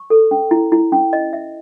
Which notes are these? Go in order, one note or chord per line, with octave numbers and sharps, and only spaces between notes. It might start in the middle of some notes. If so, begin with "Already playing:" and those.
Already playing: C#6
A4
C#4
E4
E4
C#4
D#5
E5